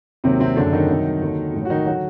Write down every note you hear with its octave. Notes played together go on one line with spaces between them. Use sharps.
D#2 C3 D#3 F#3 C4
C3 C4
F#1 F#2 D3 F#3 D4
D#3 D#4
C2 C3 F#3
D#2 D3 F#3
A1 A2 F#3
F#4
D#3 D#4
D3 F#3 F#4